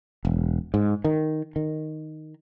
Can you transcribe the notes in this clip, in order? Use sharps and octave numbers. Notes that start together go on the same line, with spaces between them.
E1
G#2
D#3
D#3